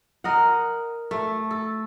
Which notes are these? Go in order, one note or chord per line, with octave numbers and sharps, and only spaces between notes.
A#4 D#5 F#5
A3
A4